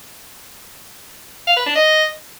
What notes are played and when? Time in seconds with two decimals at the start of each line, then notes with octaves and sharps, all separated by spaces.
1.47 F5
1.57 B4
1.66 D4
1.76 D#5